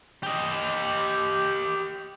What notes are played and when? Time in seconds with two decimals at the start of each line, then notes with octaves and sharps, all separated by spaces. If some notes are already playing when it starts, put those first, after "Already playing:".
0.23 G4 D#5